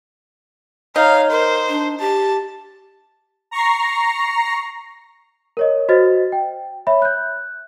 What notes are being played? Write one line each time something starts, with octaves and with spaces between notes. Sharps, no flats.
D#4 C#5 F5
A#4 C5
D4
G4 A5
A#5 C#6 A#6 C7
A#4 C#5 D#5
F#4 C5 D#5 A6
G5
C#5 E5 B5
F#6 G6